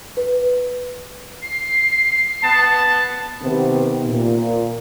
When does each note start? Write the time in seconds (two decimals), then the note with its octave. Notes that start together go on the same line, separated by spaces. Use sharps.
0.17 B4
1.42 C7
2.43 B3 A5
3.43 C3 D#3 B3
4.03 A#2